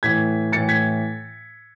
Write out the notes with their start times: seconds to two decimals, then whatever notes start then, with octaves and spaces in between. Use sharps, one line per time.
0.03 A2 E3 G#6 B6
0.52 A2 E3 A6 C#7
0.69 G#6 B6